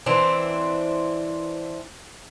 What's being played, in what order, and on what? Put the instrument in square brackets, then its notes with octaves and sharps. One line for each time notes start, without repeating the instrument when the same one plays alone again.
[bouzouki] E3 C4 D4